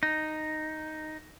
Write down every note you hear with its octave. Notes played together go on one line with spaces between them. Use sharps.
D#4